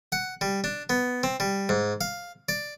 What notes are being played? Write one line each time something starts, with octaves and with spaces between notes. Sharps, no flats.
F#5
G3
D4
B3
C4
G3
G#2
F5
D5